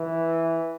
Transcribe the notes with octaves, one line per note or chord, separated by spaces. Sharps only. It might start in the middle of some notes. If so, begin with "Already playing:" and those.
Already playing: E3